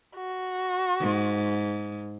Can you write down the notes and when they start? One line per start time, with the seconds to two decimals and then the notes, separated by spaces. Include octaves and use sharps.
0.17 F#4
1.00 G#2